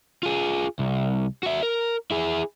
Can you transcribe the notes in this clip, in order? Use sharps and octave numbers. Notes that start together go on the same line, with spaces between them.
F4 G#4
C2
F#4 E5
A#4
E4 G#4